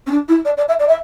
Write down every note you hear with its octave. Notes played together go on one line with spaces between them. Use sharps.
C#4
D4
E4
D5
D5
E5
D5
E5